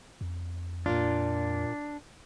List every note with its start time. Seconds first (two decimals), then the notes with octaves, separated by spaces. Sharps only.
0.21 F2
0.86 A#2 A#3 D4 F4